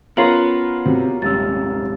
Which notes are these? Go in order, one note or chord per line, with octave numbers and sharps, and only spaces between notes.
B3 C#4 F4 A#4 B4 C6 C7 F#7
C3 F#4
D#1 G#2 C3 E6 A6